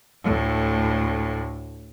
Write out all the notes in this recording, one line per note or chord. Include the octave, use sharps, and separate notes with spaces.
D2 A2